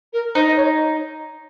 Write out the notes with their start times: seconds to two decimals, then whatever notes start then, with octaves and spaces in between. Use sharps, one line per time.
0.13 A#4
0.34 D#4 C5
0.46 D#5
0.56 C#5